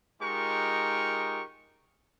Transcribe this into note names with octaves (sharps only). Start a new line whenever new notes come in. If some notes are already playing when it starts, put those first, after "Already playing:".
G#3 D#4 F4 G4 A#4 C#6